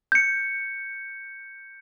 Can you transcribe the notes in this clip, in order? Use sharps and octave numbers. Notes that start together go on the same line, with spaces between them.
G6 C#7